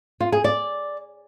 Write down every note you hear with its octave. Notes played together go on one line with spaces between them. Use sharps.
F4
G#4
D5